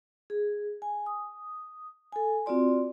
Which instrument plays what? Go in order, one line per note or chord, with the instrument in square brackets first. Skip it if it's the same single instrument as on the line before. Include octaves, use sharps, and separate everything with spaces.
[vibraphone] G#4
G#5
D#6
A4 G#5
C4 F4 F#4 D5 C6